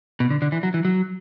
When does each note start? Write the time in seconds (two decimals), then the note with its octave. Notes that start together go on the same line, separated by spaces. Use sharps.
0.20 B2
0.30 D3
0.42 D3
0.52 E3
0.63 F#3
0.74 E3
0.85 F#3